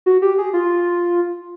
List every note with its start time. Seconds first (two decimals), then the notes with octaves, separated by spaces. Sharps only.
0.06 F#4
0.22 G4
0.38 G#4
0.54 F4